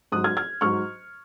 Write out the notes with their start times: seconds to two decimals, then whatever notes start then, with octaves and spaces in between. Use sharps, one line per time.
0.12 G#2 F#3 D#6 F#6
0.24 F6 G#6
0.37 F6 G#6
0.61 G#2 F#3 C#6 F6